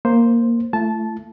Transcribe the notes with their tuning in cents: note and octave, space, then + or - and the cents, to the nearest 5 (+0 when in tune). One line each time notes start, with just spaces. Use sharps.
A#3 +0 C5 +0
A3 +0 E4 +45 A5 -15